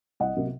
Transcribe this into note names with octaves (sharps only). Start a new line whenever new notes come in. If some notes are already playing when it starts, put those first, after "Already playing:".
C2 D#5 F#5
C3 F#3 A#3